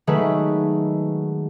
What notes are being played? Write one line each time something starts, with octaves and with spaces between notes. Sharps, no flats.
D#3 F#3 G#3 A3 B4